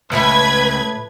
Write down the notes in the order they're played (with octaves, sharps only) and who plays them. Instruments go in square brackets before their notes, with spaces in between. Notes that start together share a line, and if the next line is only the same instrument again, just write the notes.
[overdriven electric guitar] C#2 [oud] A2 F3 E5 [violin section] B4 G#6